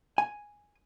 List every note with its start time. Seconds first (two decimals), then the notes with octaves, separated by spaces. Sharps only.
0.18 G#5